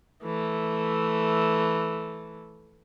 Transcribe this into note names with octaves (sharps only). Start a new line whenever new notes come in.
E3 A3